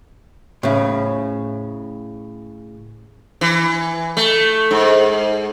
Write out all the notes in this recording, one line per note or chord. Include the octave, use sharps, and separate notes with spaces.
A2 C#3
E3
A3
G#2